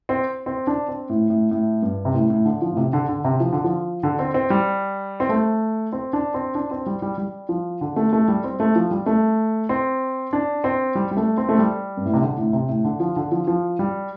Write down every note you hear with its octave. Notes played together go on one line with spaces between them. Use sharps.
C4
C4
D4
C4
A2
A2
A2
G2
C3
A2
A2
D3
F3
A2
C3
D3
D3
C3
F3
D3
F3
D3
C4
C4
G3
C4
A3
C4
D4
C4
D4
C4
G3
G3
G3
F3
D3
A3
A3
G3
C4
A3
F3
G3
A3
C4
D4
C4
G3
G3
A3
C4
A3
G3
G2
A2
C3
D3
A2
C3
A2
D3
F3
D3
F3
F3
G3